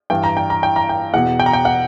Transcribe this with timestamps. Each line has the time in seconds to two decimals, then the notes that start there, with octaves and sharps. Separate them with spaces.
0.10 G2 E3 G5
0.24 A#5
0.37 G5
0.50 A#5
0.63 G5
0.76 A#5
0.89 G5
1.13 E2 B2 F#5
1.39 G5
1.46 A#5
1.53 G5
1.65 F#5